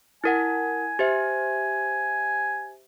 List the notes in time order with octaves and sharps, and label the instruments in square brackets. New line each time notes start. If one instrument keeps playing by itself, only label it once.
[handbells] E4 A#4 F#5 [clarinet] G#5
[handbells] G4 C5 E5